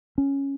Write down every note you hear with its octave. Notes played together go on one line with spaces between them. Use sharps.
C#4